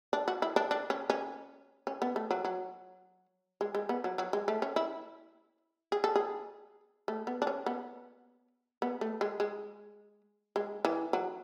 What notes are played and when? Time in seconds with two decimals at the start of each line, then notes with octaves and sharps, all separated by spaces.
0.13 D4
0.28 F#4
0.42 E4
0.56 D4
0.71 D4
0.90 C#4
1.10 C#4
1.87 C#4
2.02 B3
2.16 A3
2.31 F#3
2.45 F#3
3.61 G#3
3.75 G#3
3.89 B3
4.04 F#3
4.18 F#3
4.33 G#3
4.48 A3
4.62 C#4
4.76 E4
5.92 G#4
6.04 A4
6.16 G#4
7.08 A3
7.27 B3
7.42 D4
7.47 C#4
7.66 B3
8.82 B3
9.01 A3
9.21 G#3
9.40 G#3
10.56 G#3
10.85 E3
11.13 F#3